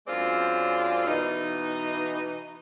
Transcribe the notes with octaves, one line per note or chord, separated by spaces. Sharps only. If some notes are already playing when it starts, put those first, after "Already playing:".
F#2 G#3 C4 D4 F4 D5
B2 E3 D#4